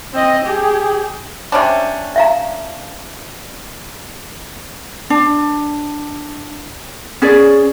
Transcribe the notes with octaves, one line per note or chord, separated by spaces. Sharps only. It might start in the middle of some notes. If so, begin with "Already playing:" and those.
C4 D#5
G4 G#4
C3 C#4 D4
E5 F5 A#5
D4
C#4 G#4 D5